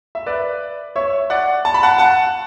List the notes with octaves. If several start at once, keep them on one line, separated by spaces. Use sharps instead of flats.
E5
B4 D5
C#5 E5
D5 F#5
A5
B5
F#5 A5
F#5 A5